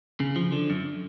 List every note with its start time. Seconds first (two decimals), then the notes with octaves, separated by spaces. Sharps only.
0.20 C#3
0.36 F3
0.52 D3
0.70 F#2